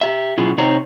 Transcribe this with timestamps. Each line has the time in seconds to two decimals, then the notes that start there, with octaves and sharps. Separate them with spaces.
0.01 G4 E5
0.38 B2 F#3 C#4 E4 F4 G#4
0.58 C3 C4 D#4 C5 C#5 A#5